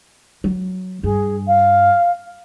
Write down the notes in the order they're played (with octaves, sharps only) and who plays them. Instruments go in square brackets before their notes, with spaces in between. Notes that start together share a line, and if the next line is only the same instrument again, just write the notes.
[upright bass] F#3
[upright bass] G2 [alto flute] G#4
[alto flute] F5